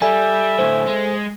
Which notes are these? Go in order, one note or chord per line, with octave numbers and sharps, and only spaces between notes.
G3 A4 E5 G#5
D2 A2 C5
G#3